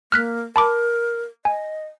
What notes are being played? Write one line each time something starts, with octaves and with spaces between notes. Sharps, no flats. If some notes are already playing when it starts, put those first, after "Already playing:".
A#3 F6 F#6 B6
A#4 A5 B5 D6
D#5 G#5